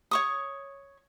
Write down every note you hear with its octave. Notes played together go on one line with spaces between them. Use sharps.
C#5 C#6 D#6